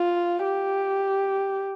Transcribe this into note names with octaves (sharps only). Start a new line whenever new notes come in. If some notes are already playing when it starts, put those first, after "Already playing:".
Already playing: F4
G4